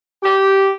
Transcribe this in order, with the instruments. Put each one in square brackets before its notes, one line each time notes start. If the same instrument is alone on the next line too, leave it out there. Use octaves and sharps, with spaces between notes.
[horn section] G4